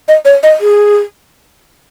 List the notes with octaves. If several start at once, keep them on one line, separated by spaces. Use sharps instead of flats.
D#5
C#5
D#5
G#4